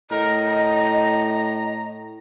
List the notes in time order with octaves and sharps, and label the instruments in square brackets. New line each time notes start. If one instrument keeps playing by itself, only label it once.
[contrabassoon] A2 [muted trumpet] A#4 [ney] D#5
[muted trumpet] A#5